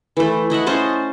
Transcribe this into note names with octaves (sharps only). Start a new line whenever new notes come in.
E3 A3
E4 D#5 E5 F#5
C#4 C5 D#5 A5